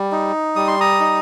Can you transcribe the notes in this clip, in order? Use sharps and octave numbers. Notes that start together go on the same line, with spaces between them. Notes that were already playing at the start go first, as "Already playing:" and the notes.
Already playing: G3
D#4
G3 D#6
C6
A#5 D#6
D#4